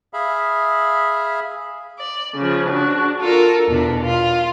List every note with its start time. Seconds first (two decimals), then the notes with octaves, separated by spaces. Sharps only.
0.13 G#4 E5 F5 B5
1.99 D5
2.36 C#3 F3
2.70 D4 F#4
3.20 F4 A4 A#4
3.68 E2 B2 D4
4.02 F4